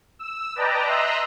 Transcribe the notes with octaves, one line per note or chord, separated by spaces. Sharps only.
E6
B4 D5 D#5 G5 A5 A#5
D#5 E5 A#5 C6 E6 F#6